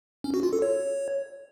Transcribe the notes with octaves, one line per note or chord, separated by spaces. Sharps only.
C#4
F#4
F4
A4
C#5